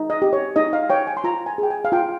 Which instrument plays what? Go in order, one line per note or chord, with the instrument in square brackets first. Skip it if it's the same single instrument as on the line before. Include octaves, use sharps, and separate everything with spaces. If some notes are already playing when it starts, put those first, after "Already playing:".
Already playing: [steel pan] D#4
D#5
G4
C#5
D#4 D#5
F5
C#5 G5
G#5
C6
F4 A#5
G#5
G#4 G5
G#5
F5
F4 G5